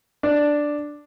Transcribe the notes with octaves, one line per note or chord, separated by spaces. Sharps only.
D4